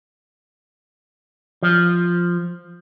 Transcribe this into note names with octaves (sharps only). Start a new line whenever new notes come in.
F3